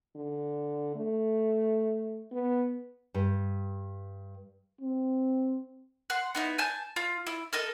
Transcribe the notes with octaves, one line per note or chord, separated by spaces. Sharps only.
D3
A3
B3
G2
C4
F#5 C6
B3 D#4 E4
G#5 A5 G6
F4
E4
A4 A#4 D#5